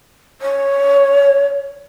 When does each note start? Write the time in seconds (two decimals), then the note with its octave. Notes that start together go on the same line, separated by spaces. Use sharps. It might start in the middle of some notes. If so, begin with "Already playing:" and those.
0.41 C#5